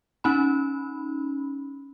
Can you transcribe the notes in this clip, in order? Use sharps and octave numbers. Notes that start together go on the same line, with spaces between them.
C#4 D#4 B5